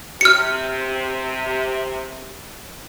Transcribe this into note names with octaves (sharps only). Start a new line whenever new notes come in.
C3 F6 C#7